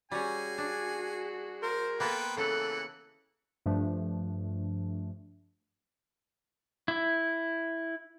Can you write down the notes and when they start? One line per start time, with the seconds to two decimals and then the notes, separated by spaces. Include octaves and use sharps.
0.12 G3 C#4 F#4 G#4 G#5
0.58 D4
1.63 A#4 C5
2.00 A#3 B3 A4 B4 C5 G5
2.37 C#3 E3 A4 F#5 F#6 C#7
3.66 G2 F3 A3 D4
6.88 E4